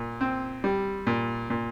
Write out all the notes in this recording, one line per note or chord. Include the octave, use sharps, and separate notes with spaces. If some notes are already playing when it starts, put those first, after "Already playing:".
Already playing: A#2
C4
G3
A#2
A#2